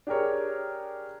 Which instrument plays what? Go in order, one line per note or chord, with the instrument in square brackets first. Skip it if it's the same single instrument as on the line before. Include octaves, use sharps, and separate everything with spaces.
[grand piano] D4 G4 G#4 A#4 C#5